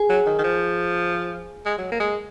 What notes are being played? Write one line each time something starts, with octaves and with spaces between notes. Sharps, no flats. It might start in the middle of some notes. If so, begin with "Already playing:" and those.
Already playing: G#4
F#3
D#3
D#3
F3
G#3
F#3
A#3
G#3